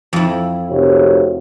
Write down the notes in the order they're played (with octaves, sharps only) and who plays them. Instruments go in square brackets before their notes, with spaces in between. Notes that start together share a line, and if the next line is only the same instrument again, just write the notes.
[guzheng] F2 E4
[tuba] F1 [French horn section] F#4 A#4 C#5